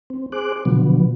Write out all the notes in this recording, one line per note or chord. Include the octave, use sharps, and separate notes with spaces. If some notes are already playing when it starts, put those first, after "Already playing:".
C4
G#4 C5 D6 F#6
B2 D3 F3 F#3 B3